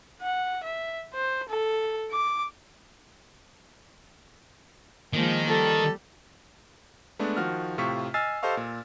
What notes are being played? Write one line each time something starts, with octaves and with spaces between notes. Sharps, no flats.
F#5
E5
C5
A4
D6
D#3 F3 G#3 A#3
G3 A4
G#3 A3 B3 D4
D#3 F3 F#4 F6
A2 C3 F4 C#6 B6
D#5 G#5 E6 F6 A6 C7
G4 A4 C5 D#5 F5 C#6
A#2